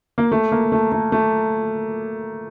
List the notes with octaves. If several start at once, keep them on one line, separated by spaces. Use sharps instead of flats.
A#3
A3
A#3
A3
A3
A3